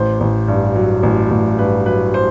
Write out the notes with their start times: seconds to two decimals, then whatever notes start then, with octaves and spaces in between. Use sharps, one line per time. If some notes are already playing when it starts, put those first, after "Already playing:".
Already playing: A1 C5
0.20 A1
0.48 G2
0.76 F#3
1.03 A1
1.31 A1
1.58 G2 B4
1.86 F#3 B4
2.14 C5